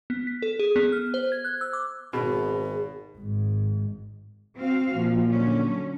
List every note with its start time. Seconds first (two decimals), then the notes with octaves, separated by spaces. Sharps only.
0.10 B3
0.27 B6
0.42 A4
0.59 G#4
0.76 B3
0.92 F6
1.14 C5
1.32 G#6
1.44 F#6
1.61 E6
1.73 D6
2.13 G#1 B2 G#4
3.17 G#1 G#2
4.57 C4 F#4 F5
4.96 A#2 F3
5.30 D3 F#3 C#4